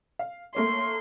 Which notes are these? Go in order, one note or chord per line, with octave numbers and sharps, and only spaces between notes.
F5
A3 A#3 C#5 C6